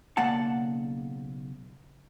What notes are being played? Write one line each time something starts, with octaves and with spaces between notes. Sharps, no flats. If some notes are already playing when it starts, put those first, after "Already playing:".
B1 C#3 A#3 D5 F#5 A5